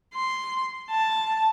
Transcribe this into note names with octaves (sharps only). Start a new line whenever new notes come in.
C6
A5